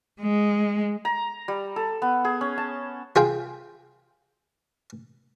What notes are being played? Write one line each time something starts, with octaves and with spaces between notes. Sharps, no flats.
G#3
A#5
G3
A4
B3
G#4
C#4
A5
F4 G#4 G5